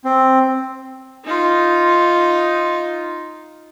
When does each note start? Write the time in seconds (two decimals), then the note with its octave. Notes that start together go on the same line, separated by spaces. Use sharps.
0.05 C4
1.25 D#4 F4